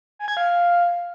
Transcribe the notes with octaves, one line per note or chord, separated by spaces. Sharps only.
G#5
G#6
F5